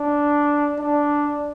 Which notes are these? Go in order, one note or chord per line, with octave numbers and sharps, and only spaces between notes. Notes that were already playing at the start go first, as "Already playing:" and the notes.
Already playing: D4
D4